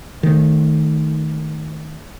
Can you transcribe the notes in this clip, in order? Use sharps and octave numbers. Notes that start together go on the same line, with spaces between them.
D#3 A3